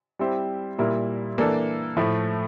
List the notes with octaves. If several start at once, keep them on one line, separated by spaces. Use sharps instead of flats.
G3 C4 E4 G4 C5
A#2 G3 A#3 E4 A#4
E3 A#3 D4 A4
A2 F3 A3 E4